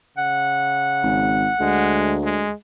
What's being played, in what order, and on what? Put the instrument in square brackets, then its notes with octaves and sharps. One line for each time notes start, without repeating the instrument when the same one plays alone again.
[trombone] C#3 [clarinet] F#5
[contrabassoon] G#1
[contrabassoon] D2 [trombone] G#3
[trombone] G#3